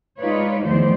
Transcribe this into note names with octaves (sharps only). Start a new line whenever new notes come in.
G#3 D#4 F4 B4 C#5 D5
E2 D#3 F3 A3 C5 D5